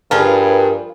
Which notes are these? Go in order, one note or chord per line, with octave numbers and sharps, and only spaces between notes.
G2 F3 F4 G#4 A#4 B4